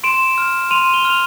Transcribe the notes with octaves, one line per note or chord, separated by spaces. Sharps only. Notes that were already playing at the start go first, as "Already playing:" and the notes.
C6 D7 E7
F6
C6 D#7 F7
F7 G7
F6
F7